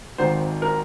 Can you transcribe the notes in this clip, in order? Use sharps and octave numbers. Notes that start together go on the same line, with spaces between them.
G#1 G#2 D#3 C5
A#4